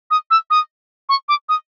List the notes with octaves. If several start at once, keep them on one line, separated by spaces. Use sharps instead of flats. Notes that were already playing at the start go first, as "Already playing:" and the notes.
D#6
E6
D#6
C#6
D6
D#6